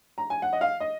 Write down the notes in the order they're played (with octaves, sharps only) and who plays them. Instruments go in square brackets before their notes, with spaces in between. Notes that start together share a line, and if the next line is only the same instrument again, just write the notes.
[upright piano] A#5
G#5
F#5
D#5
F5
D#5